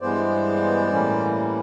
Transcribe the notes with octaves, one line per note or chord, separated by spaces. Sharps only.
G2 E3 G#3 B3 C5 D5
A2 E3 G3 A#3 C#4